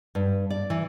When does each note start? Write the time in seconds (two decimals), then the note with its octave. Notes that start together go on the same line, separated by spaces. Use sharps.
0.15 G2
0.50 D5
0.70 E3